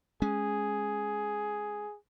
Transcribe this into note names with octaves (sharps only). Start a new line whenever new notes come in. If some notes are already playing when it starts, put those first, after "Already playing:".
G#3 C#4 G#4